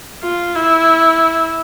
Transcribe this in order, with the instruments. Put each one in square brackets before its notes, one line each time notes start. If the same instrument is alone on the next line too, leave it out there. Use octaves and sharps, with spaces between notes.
[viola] F4
E4